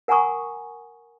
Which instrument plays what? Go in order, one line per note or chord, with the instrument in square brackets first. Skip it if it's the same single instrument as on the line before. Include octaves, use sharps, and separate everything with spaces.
[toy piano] A#4 F#5 G#5 A#5 C#6 D#6